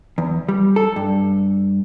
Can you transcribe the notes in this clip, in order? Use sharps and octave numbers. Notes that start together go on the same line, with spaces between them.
E2
G3
A4
G2